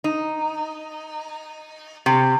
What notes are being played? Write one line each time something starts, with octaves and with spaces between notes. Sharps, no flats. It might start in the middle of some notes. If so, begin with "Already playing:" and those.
D#4
C3